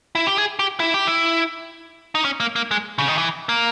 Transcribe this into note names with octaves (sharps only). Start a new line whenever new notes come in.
E4
G4
G#4
G4
E4
G4
E4
D#4
C#4
A#3
A#3
G#3
C#3
D#3
E3
A#3